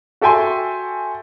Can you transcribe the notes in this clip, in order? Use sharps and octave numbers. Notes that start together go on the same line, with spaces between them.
F#4 A4 E5 G5 G#5 C6